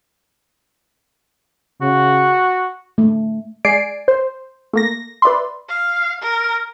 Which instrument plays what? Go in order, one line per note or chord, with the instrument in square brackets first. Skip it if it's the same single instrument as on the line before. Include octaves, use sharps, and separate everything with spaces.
[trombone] C#3 [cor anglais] F#4
[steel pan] A3
[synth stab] G#3 D5 G#5 C7 D7
C5
A3 A#3 A#6
B4 D5 E5 C6
[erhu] F5
A#4